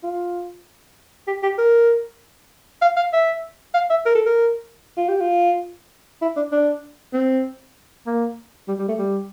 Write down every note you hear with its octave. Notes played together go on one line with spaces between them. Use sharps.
F4
G4
G4
A#4
F5
F5
E5
F5
E5
A#4
A4
A#4
F4
G4
F4
E4
D4
D4
C4
A#3
G3
G3
A3
G3